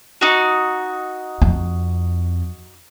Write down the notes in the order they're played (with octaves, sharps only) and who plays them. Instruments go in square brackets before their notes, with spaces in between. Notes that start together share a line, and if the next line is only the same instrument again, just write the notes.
[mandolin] D#4 F#4
[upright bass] F2